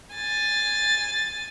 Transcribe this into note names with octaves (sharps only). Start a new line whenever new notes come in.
G#5 A6